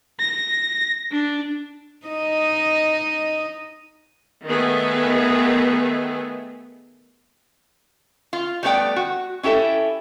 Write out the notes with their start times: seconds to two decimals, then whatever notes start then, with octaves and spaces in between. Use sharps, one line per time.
0.20 A#6
1.12 D4
2.06 D#4 D#5
4.46 D#3 A3 B3 G#4
8.33 F4
8.63 G3 A3 B3 D4 D5 G5
8.96 F#4
9.43 C#4 E4 G4 A4 E5